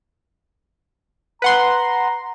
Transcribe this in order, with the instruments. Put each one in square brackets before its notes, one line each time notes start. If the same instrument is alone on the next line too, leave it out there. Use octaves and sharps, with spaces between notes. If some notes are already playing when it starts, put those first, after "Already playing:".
[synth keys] B4 F#5 C6 [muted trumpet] A#5